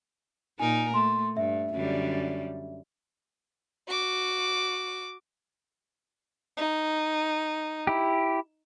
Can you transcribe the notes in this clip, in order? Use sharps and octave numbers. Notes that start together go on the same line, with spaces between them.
A#2 D#4 A#4 G#5
A3 C6
G2 E5
F#2 D3 G3
F#4 D6
D#4
E4 G4